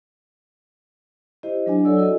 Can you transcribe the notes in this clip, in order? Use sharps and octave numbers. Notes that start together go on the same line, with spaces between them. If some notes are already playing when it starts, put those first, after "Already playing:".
E4 G4 C5 D#5
F#3 D4 G#5
F#3 A4 C#5 D5 E6
E4 F#4 A4 D#5